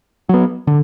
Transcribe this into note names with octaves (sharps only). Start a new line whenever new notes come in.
F#3 B3
D3